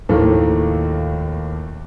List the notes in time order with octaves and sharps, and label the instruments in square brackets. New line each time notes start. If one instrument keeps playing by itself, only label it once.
[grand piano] D#2 A2 D#3 F3 A3 A#3